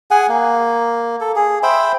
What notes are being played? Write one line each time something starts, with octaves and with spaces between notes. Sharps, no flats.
G#4 F#5 G#5
A#3
A4
G#4
C5 E5 G5 B5